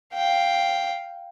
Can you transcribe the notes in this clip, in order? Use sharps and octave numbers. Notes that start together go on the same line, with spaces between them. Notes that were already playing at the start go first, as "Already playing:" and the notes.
F5 G5